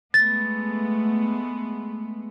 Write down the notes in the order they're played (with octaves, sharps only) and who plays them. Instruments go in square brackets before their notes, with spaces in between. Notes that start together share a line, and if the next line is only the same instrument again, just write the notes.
[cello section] G#3 A3 B3 [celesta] A6